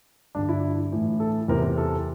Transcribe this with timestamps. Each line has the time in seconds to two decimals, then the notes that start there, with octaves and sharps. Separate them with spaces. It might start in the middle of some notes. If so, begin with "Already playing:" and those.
0.35 G2 D3 D4
0.49 E4
0.92 A2 E3
1.20 A4
1.48 E2 C3 E3 A#4
1.78 A4